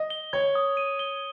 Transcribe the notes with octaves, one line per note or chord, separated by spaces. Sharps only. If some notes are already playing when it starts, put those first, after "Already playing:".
Already playing: D#5
G7
C#5 G#6
D#6
D#7
G7